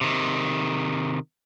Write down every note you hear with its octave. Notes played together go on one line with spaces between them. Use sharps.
C3 D#3